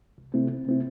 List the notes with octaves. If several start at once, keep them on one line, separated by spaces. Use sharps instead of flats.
C2
C3 A3 C4 E4
C2
C3 A3 C4 E4